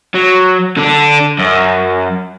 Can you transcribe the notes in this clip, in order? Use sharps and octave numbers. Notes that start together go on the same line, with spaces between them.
F#3
D3 D4
F#2